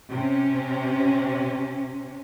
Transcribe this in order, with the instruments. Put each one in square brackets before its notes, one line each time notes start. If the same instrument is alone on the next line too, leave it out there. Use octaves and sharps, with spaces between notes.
[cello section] C3 C#4